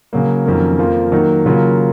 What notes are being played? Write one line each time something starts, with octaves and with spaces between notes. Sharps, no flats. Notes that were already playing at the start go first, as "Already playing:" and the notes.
C#3 F#3 A#3
F2 D#3 F#3 A#3 C#4
F2 F3 A#3 F4
D#3 F#3 A#3
C#3 F#3 A#3 F4